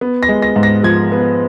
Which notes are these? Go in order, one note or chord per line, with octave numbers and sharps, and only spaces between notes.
B3
A#6
G#3
A#6
G#2
A#6
F3 G#6
B3